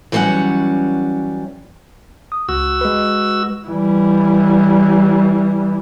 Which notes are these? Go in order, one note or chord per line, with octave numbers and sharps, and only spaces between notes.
E3 F#3 G3 A#3 C#4 F#5
D#6
C#2 F#4 E6
G#3 B4
E3 G3